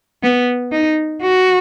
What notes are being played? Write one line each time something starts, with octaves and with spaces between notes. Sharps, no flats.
B3
D#4
F#4